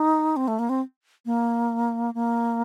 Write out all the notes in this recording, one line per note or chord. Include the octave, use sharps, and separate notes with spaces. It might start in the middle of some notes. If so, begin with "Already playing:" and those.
Already playing: D#4
C4
A3
A#3
C4
A#3
A#3